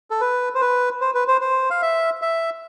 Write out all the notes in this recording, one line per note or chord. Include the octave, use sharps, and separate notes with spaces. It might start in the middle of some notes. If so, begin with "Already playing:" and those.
A4
B4
C5
B4
C5
B4
C5
C5
F5
E5
E5